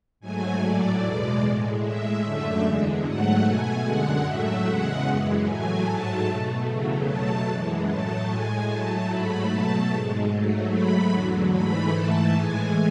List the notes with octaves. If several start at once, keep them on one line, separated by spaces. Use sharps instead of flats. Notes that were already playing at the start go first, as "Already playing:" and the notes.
G#2 F#3 A3 G#5
A2 F#3 A3 D5
E2 B2 G#3 D5
A2 G#3
A2 G#3 E5
F#2 D3 A3 E5
E2 D3 G#3
G#2 F#3 A3 F#5
B2 A3 G#5
F#2 D3 G#3 F#5
A2 F#3 A3 E5
E2 C#3 G#3 F#5
F#2 E3 G#3
A2 F#3 A3 G#5
G#2 F#3 A3 A5
B2 A3
E2 C#3 F#3 A3
B2 F#3 A3 A5
F#2 E3 G#3
A2 F#3 A3 A5
A2 G#3 G#5
A2 F#3 A3 A5
G#2 F#3 A3 B5
B2 F#3 A3 A5
G#2 G#3
G#2 F#3 A3
G#2 F#3 A3 B5
E2 D3 F#3
G#2 E3 A3 B5
G#2 E3 A3 A5
A2 E3 G#3 G#5